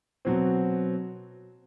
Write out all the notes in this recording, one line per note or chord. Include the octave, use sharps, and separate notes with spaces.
B2 F#3 C4